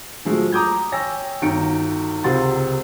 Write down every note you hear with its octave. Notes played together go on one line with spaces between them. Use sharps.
A#2 F3 F#3 G#3 A3
A#5 D6 D#6 G6 G#6
C#5 G5 G#5 E6 A#6
G1 D#3 F#4 A#5 C#7 D7
C#2 C3 A#4 F#5 C6 A6